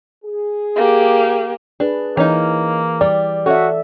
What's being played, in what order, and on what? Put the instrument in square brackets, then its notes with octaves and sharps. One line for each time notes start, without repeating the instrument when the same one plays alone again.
[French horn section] G#4
[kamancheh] A#3 G4
[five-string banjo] D4 [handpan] G#4 B4
[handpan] E3 [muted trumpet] A#3 [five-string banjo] C#4 D#4
[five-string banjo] G3 [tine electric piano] D5
[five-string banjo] C#4 [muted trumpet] F#4 [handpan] A4 E5